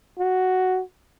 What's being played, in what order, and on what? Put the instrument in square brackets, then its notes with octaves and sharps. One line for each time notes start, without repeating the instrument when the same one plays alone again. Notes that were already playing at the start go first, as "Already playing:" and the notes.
[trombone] F#4